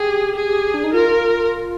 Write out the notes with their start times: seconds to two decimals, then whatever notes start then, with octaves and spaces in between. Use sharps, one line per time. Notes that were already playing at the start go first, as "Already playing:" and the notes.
Already playing: G4 G#4
0.35 G#4
0.74 D4
0.84 D#4
0.93 F4 A#4